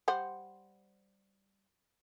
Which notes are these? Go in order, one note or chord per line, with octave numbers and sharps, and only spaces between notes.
G3 C5 F#5